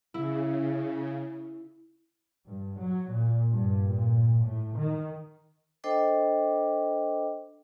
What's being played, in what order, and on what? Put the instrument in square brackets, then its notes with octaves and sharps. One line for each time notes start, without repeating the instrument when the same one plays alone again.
[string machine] C#3 [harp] E4
[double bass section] G2
F#3
A#2
G2
A#2
A2
D#3
[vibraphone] D4 A4 C5 D#5 G5 D6